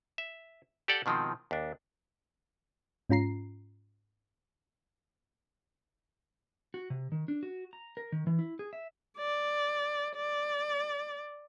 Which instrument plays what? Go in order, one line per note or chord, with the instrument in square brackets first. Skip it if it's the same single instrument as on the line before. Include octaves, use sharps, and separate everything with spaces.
[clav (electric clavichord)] E5
G4 A4 D5 F#5 G5
B2 D#3 F3 G#3 C4
D#2 D4
[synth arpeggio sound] G#2 C#4 F4 A#5 C7
[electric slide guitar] F#4
C3
D#3
D4
F#4
A#5
A#4
D#3
E3
E4
G#4
E5
[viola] D5
D5